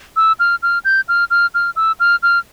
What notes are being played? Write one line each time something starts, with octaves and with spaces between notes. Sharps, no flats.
E6
F6
F6
G6
F6
F6
F6
E6
F6
F6